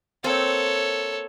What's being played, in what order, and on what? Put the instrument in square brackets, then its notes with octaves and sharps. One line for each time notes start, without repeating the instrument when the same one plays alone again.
[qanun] A#3 C4 [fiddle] A4 C#5